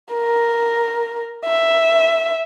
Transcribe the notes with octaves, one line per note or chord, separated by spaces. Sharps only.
A#4
E5